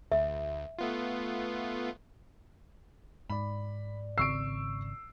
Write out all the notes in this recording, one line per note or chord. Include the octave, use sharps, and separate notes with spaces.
D2 E5
A3 B3 F4
G#2 D5 B5
G#1 C#3 C4 C#6 E6 C7 D7